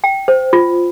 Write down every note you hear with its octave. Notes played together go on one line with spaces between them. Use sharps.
G5
C5
F4